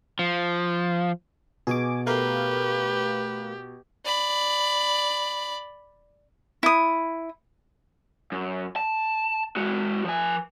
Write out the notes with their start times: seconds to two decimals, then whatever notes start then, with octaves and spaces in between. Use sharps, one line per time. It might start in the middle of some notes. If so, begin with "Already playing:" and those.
0.19 F3
1.67 B2 G#4 G#5 D6
2.07 A3 G4 A#4 B4 F5
4.05 D5 B5
6.63 E4 D#6
8.32 F#2
8.76 A5
9.57 G#3 F#4
10.05 F3 G#5